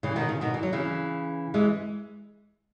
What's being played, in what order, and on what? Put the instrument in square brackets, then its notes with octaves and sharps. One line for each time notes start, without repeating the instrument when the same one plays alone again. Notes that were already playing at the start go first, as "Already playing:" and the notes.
[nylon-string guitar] C#3 E3
B2 D#3
C#3
B2 D#3
E3
F#3
C#3 E3
E3 G#3